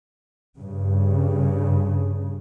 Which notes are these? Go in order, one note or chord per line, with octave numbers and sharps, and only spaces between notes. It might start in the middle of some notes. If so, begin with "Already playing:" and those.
G2 C#3